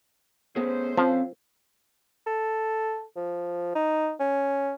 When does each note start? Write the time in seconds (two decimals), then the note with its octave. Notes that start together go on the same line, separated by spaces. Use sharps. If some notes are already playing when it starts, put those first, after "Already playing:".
0.56 A3 B3 C#4 G#4 C5
0.97 F3 C4 A4 F5
2.27 A4
3.16 F3
3.75 D#4
4.20 C#4